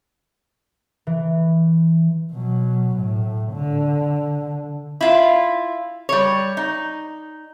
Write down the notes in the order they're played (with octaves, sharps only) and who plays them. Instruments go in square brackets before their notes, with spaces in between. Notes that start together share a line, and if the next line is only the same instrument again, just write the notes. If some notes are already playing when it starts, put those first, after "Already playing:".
[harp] E3
[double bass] B2 F#3
A2
D3
[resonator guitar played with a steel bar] E4 F4
G3 C#5
D#4